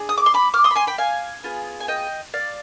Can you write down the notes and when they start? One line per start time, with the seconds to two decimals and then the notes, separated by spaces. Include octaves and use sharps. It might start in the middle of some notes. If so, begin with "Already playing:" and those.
Already playing: D4 G#4
0.09 D#6
0.18 D6
0.26 C6
0.34 B5 D6
0.54 D6 F6
0.64 C6 D#6
0.71 B5
0.75 G#5 C6
0.87 G5 B5
0.98 F5 G#5
1.44 B3 F4 G#4
1.80 G#5
1.88 D#5 G5
2.33 D5 F5